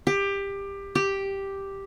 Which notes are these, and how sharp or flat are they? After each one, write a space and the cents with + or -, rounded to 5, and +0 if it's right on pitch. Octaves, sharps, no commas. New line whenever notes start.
G4 +20
G4 +0